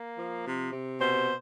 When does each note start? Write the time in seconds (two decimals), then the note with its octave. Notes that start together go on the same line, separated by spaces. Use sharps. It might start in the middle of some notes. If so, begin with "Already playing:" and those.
Already playing: A#3
0.18 F3
0.46 C3
0.72 C3
0.99 B2 C5